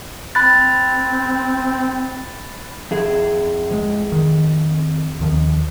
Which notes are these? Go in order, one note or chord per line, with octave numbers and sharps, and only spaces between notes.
C4 B5 F#6 A6
F2 G#4 E5
F3 G#3
D#3
D#2 D#3 F3